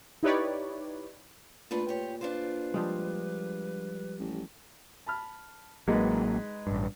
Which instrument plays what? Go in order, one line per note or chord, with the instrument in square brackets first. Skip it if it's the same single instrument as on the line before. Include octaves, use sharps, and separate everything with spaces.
[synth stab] D#4 E4 G4 B4 C#5 D5
[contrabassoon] A#2 [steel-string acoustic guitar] A3 D4 B4 [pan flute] F4
[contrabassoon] A#2 [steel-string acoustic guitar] G4 C#5
[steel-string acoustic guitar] D4 F4 C5 [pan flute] B4
[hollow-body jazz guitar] F3 G3 G#3
[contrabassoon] A1
[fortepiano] A5 B5 F6
[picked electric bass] A1 F#3 A#3 [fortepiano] G#3 D#4 B4
[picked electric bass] A1 G2